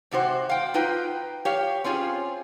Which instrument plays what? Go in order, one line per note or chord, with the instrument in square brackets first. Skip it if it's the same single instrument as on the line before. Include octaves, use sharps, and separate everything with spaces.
[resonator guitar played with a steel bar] G#2 C3 F#4 C5
F5 G5
D#4 F4 B4 G5
G4 C#5 F5
C4 C#4 F4 G#4